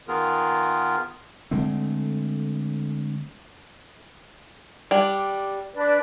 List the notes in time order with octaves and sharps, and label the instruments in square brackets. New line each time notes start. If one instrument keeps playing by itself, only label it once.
[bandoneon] D#3 B3 F4 G#4 A#4
[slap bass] D3 G#3 A3 C4
[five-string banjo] G3 D4
[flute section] D4 B4 D5